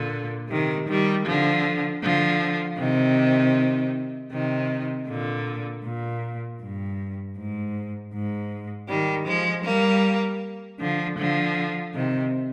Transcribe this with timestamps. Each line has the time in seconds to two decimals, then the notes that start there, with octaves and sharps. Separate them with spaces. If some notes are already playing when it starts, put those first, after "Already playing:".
Already playing: A#2 D3
0.50 C3 D#3
0.88 D#3 G3
1.26 D3 F3
2.02 D3 F3
2.78 C3 D#3
4.31 C3 D#3
5.07 A#2 D3
5.84 A#2
6.60 G2
7.36 G#2
8.13 G#2
8.89 D#3 G3
9.27 F3 G#3
9.65 G3 A#3
10.80 D3 F3
11.18 D3 F3
11.94 C3 D#3